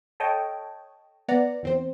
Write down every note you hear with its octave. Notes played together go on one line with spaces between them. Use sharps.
A4 C#5 D#5 G5 A5
B3 D5 F#5 A#5
E2 C4 C5